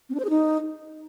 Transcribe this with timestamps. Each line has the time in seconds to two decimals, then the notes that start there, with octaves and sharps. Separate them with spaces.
0.09 C4
0.15 D4
0.20 C5
0.25 G#4
0.30 D#4